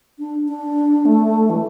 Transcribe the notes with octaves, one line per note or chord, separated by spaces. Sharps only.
D4
D4
A3
E3